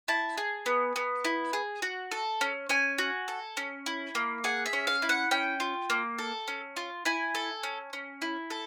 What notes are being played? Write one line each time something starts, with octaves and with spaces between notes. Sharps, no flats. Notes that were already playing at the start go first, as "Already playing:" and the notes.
E4 A5
G#4
B3
B3
E4
G#4
F#4
A4
C#4
C#4 G#5
F#4
A4
C#4
E4
A#3
G#4 F#5
E5
C#4
F5
E4
F#5
C#4 G5
F4
A#3
A4
C#4
F4
E4 G#5
A4
C#4
C#4
E4
A4